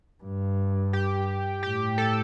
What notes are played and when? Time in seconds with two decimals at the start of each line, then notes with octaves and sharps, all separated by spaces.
0.24 G2
0.93 G4
1.62 A2 G4
1.98 A4